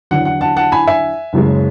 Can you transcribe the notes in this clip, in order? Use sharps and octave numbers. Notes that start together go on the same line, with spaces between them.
E2 D3 F#3 F#5
F#5
F#5 A5
F#5 A5
G#5 B5
E5 G#5
F#1 F#2 C#3 G#3